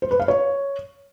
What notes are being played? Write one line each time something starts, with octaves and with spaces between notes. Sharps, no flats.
C5
B4
F5
C#5